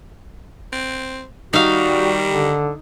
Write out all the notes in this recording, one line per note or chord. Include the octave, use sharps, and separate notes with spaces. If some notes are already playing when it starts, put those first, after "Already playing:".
C4
D#3 G3 D#4 F#4 F5
D3